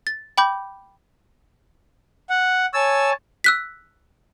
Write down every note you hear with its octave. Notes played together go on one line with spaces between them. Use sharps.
A6
G5 B5 D6 G6
F#5
C#5 G#5 A5 E6
E6 F#6 B6